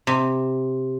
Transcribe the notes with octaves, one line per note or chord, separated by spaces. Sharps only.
C3